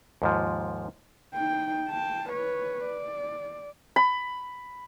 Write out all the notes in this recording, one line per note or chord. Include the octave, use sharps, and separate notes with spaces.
D#2 G#2 F3
D#4 G5
G5 A5
B4 C#5
D5
B5